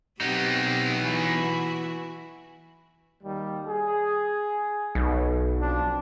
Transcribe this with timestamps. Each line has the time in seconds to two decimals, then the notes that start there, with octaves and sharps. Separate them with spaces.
0.21 B2 F#3 B3 C4 D#4 G4
0.99 E3 E4 F#4
3.23 D#2 D#3 G3
3.66 G#4
4.95 B1
5.60 F3 C4 D4